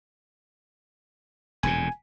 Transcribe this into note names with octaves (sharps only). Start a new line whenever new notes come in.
E1 F2 A#2 G#5